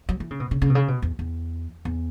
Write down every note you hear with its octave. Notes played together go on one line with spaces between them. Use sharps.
F#3
E3
C#3
B2
C#3
C#3
B2
C#3
B2
E2
E2
E2